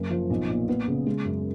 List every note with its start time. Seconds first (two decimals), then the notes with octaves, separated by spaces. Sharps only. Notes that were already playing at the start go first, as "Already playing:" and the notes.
Already playing: F#1
0.10 F3
0.30 B1
0.49 A#2
0.69 B3
0.88 C#3
1.07 G#3
1.25 F#2